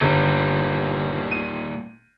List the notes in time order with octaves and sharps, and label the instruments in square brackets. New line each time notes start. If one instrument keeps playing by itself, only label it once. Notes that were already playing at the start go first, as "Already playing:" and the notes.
[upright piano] G1 [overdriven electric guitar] A#2 G3
[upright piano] D#7